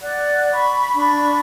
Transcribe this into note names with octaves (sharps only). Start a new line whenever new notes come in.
D5 F#5 F#6
B5 C#6
D4 B5 C#6